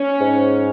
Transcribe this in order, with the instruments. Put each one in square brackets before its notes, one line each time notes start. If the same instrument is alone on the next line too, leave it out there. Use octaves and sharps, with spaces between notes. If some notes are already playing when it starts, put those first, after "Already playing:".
Already playing: [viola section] C#4
[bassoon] G#2